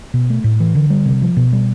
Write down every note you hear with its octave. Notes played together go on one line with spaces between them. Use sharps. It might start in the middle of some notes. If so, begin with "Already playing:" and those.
B2
A3
A2
E3
D3
G3
C3
F3
B2
G3